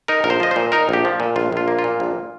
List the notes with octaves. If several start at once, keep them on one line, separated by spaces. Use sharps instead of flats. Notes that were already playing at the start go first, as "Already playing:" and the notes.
D#4 A#4
A#1 A#4
C5
F3 D#5
A#2 C5
D#4 A#4
A#1 G4
F3
A#2
A#1 F4
A#1 F4
A#3
F4
A#2
A#1